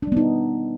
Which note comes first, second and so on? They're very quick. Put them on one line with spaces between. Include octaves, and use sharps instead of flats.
D4 G3 B3 D#4